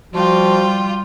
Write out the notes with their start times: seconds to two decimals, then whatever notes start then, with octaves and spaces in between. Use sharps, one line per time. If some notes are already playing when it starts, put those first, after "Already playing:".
0.14 F3 G3 F4 F#4 G5